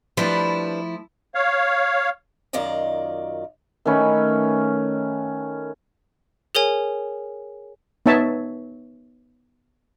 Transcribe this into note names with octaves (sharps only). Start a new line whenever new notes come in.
F3 G3 A3 D4 E4 B4
C#5 F5
F#2 D#3 F4 D5 D#5
D#3 A3 C#4 B4
G#4 A#4 C#5 G#5
B3 D#4 C#5 E5 A5